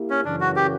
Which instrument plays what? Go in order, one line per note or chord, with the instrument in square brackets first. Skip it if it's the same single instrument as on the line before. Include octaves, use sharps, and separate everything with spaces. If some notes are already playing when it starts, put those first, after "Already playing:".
Already playing: [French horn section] A#3 E4 G4
[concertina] C#4
[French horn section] F#2 C#3 E3 [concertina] D4
[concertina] F#4
G4